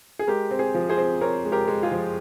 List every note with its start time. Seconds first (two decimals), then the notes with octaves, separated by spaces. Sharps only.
0.19 G#4
0.27 G#3 G4 A#4
0.51 C4
0.59 G#4 C5
0.74 F3
0.89 G#4 C5
0.97 C4
1.21 C4 A#4 C#5
1.45 G#3
1.52 G4 A#4
1.68 G#3
1.83 F4 G#4
1.92 F3